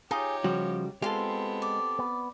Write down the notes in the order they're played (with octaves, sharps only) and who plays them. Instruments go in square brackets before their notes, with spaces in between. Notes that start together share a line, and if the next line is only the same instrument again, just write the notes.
[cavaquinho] D#4 F4 [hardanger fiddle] G4 C#5 [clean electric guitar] G#4
[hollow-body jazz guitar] C#3 G3 F#4 [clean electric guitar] F3
[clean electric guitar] G#3 [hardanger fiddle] B3 C4 [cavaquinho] F4 C6 [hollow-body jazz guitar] G4 A4
[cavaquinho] D5
[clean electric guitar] B3